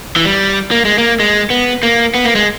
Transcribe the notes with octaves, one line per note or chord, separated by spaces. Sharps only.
E3
G3
A#3
G#3
A#3
G#3
B3
A#3
B3
A#3
G#3